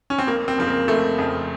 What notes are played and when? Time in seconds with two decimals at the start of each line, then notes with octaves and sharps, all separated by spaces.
0.10 C#4
0.19 C4
0.27 F1 A#3
0.48 C4
0.58 F2 C#3 F3 C4
0.67 A#3
0.88 F1 A3
1.18 F2 C#3 F3